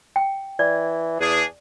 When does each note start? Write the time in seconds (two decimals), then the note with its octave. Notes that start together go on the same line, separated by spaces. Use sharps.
0.16 G5
0.59 E3 D5
1.20 E2 D4 G#4